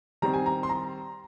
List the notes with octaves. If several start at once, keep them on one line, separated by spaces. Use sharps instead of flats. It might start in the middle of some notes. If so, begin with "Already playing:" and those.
D#3 G3 C4 A#5
G#5
A#5
C6
A#5